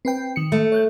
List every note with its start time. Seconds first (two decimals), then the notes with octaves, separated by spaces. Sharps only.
0.05 C4 B4 G5
0.36 D#3 C#7
0.52 A3
0.72 C#5 F#6 G6